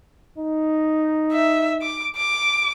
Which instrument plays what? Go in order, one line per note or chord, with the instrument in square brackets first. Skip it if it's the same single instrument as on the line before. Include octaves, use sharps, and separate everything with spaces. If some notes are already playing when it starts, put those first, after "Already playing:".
[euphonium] D#4
[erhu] E5
D6
D6